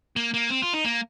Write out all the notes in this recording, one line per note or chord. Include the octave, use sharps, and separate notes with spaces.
A#3
A#3
C4
F4
D#4
A#3